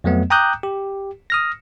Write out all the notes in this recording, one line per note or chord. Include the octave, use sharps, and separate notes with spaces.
F2 F#3 A3 B3
G5 A#5 D6 D#6 F#6 G6
G4
D#6 F6 A#6